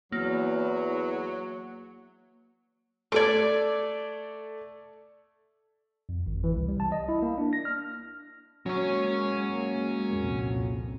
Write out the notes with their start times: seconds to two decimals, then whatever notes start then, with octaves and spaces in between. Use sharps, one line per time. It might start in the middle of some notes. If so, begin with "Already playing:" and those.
0.12 E2 F#3 A#3
3.12 A3 A4 D5 D6 G#6
6.09 F2
6.26 G#1
6.44 E3
6.56 C2
6.69 G3
6.80 A5
6.92 D#5
7.09 E4
7.22 A#3
7.38 D4
7.53 A#6
7.65 F6
8.66 F#3 G#3 A#3 C#4 C#5
10.13 C2 F2 A#2